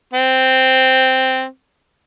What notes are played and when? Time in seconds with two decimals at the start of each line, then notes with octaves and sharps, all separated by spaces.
0.14 C4